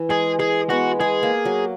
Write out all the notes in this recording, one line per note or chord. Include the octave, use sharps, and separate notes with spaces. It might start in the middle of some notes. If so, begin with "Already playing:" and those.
Already playing: E3
G#3 G#4
G#3 G#4
G#3 B3 F#4
G#3 G#4
A#3
F#3